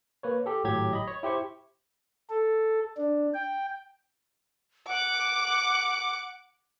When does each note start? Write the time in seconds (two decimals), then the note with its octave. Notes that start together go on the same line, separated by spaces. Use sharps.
0.23 A#3 B4 C#5
0.46 G4 A4
0.64 G#1 A2 F#3 G4 G#6
0.93 D#5 B5
1.07 C#5
1.23 E4 G4 C5 C#6
2.30 A4
2.97 D4
3.34 G5
4.88 F#5 D6